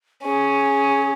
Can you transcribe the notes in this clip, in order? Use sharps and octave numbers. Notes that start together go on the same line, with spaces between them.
C#4 G#4